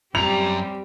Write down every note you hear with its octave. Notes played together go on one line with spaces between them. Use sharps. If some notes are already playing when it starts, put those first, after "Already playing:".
F#2 G3 C4 G4 A#5 F7